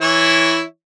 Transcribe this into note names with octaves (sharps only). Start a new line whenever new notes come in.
E3 E4 C#5